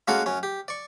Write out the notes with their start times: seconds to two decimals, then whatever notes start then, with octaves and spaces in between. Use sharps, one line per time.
0.08 G#3 A#3 C#4 F#4 A4 F#5
0.26 F#2 C#4
0.43 G4
0.68 D5 C#6